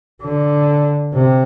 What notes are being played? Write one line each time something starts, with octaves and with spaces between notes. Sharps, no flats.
D3
C3